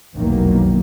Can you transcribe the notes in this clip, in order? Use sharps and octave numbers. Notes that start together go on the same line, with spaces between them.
F1 B1 E2 D#3 F#3 A#3